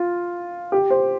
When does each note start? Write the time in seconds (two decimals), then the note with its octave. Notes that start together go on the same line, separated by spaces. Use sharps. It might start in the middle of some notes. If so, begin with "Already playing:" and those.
Already playing: F4
0.72 G4
0.90 C5